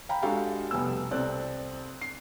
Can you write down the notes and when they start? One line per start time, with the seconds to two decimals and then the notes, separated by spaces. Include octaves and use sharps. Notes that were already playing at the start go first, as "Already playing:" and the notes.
0.09 F5 G5 A#5 B5
0.22 G#3 D4 F#4 G4 A4 F5
0.71 F1 B2 G3 B3 G#5 E6
1.11 C2 C4 A4 D5 F#6
2.01 C7